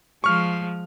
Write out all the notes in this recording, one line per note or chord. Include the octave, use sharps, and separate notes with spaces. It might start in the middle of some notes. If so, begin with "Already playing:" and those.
F3 G#3 C#6 F6